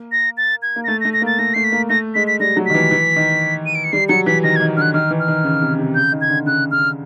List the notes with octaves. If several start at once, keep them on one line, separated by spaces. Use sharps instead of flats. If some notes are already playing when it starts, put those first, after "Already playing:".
Already playing: A#3
A#6
A6
G#6
A#3
A#6
A3 A6
A#6
A3
A#6
A#3 A6
A3 A#6
A3 C7
B6
A#3
A3 A#6
G#3 B6
B6
G3 A#6
F#3
D#3 B6
E3
E3
D#3
D#7
D7
C#7
G3 C7
F#3 C#7
E3 B6
D#3 A#6
G#6
D#3
D3 F6 F#6
D#3 F6
E3
F6
D#3
C#3
C3
C3
C#3 G6
D#3
G#6
D3
C#3 F#6
C#3 F6